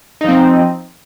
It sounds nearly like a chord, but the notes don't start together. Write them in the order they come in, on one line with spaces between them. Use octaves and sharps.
D#4 F3 C4